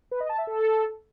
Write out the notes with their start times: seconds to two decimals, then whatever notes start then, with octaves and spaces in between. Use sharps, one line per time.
0.11 B4
0.20 D#5
0.29 A5
0.38 E5
0.47 A4